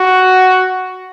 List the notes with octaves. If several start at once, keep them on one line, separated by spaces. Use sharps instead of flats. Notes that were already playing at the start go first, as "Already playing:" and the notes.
Already playing: F#4